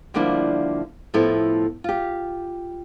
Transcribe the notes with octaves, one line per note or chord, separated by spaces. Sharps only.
D3 F3 G3 A#3 D4 E4
A2 F3 B3 E4 A4
F4 G4